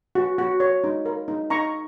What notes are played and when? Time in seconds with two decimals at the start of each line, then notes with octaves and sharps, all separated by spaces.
0.15 F#4
0.38 F#4
0.60 C#5
0.84 D#4
1.06 A#4
1.28 D#4
1.50 D#4 A#5 C#6